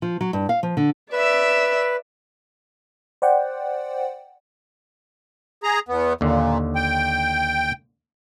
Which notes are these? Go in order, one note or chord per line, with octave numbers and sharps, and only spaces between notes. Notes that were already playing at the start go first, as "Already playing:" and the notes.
F3
F#3
G2
F5
F3
D3
B4 D5 E5 E6
C5 D5 F#5 G5
G#4 A#5
E2 B3
D#2 A#2 D3
G5